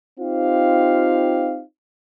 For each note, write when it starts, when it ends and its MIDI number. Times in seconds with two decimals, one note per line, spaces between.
0.20 1.62 60
0.20 1.62 63
0.20 1.62 65
0.20 1.62 67
0.20 1.62 77